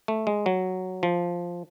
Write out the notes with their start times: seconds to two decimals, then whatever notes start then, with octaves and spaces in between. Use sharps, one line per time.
0.08 A3
0.27 G#3
0.46 F#3
1.03 F3